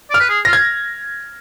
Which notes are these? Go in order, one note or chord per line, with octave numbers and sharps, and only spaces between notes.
D5
F6
B4
G#4
F4 A#6
G#6